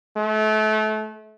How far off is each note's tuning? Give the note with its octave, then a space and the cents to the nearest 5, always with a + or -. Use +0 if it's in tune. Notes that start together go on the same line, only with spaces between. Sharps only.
A3 -30